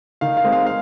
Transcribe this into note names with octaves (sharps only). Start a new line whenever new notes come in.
D#3 F5
F5
G#3 C4
F5
F5